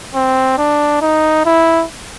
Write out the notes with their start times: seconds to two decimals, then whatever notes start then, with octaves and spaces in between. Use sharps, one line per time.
0.14 C4
0.58 D4
1.01 D#4
1.45 E4